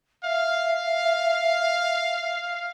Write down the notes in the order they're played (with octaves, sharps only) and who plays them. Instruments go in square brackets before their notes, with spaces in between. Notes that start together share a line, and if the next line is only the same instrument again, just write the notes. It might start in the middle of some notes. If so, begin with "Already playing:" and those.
[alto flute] E5 [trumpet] F5